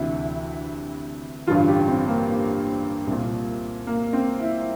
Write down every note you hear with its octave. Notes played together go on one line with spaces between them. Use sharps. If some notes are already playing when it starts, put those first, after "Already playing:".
Already playing: D2 C3 E3 E4
A1 G2 D3 F4
G4
C4
A#3
C2 A#2
A#3
C4
E4